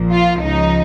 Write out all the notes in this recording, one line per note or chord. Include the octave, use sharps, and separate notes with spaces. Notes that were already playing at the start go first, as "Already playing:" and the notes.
Already playing: A#1 A#2 F3
F4
C#2 C#3 F3 D#4